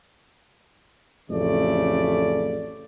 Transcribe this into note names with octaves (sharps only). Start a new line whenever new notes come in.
A1 F2 C#3 A3 D5